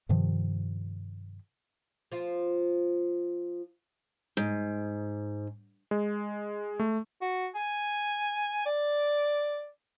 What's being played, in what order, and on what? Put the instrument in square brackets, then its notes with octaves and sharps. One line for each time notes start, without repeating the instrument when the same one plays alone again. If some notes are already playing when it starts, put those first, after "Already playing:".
[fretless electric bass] G2 C3 D#3 F3
[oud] F3 F4
[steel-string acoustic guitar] G#2
[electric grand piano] G#3
A3
[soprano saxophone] F#4
G#5
D5